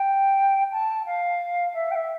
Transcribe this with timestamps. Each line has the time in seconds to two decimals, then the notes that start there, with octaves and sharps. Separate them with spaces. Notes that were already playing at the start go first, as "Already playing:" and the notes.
Already playing: G5
0.72 A5
1.06 F5
1.74 E5
1.91 G5
1.95 E5